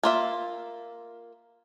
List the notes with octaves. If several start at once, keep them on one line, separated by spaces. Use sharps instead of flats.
A#3 F4 E5